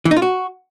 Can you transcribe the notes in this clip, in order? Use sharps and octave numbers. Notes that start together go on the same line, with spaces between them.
E3
D#4
F4
F#4